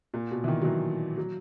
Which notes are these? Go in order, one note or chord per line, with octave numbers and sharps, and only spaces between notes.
A#2
B2
E3
D#3
F#3
E3
F#3